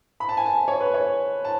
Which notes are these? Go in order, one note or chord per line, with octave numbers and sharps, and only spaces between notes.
B5
A5
G#5
A5
C#5
B4
C#5
A5